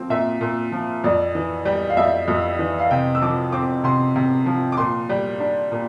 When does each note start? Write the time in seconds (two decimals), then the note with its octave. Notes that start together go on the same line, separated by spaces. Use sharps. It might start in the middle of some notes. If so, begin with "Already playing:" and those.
Already playing: F3 C4
0.10 A#2 E5
0.41 A#2
0.72 F3
1.04 F2 D5
1.35 E3
1.65 G3
1.90 F5
1.97 F2 E5
2.28 F2
2.59 E3
2.79 F5
2.91 C3 G5
3.15 E6
3.22 F3 D6
3.53 C4 D6
3.84 C3 C6
4.16 C3
4.46 F3
4.72 D6
4.77 A#2 C6
5.09 G3
5.40 D4
5.72 A#2